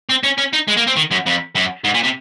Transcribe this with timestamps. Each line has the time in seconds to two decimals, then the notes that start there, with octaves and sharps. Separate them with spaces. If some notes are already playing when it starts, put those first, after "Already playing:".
0.09 C4
0.23 C#4
0.38 C#4
0.53 D#4
0.68 G#3
0.77 A#3
0.87 C4
0.96 D#3
1.11 F#2
1.26 F2
1.55 F#2
1.84 G#2
1.94 A#2
2.03 C3